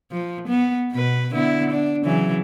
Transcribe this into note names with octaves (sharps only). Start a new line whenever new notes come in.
F3
B3
B2 B4
D3 B3 E4
D4
C#3 E3 F#3